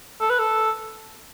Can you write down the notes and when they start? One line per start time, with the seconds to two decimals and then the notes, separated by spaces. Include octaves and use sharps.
0.20 A4
0.29 B4
0.39 A4